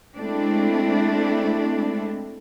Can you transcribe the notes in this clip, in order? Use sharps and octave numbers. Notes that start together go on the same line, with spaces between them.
G#3 A3 C4 D4 E4